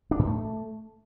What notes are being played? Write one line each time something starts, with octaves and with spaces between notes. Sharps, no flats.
D4
A2
A3